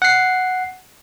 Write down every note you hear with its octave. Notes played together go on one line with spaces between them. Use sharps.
F#5 C7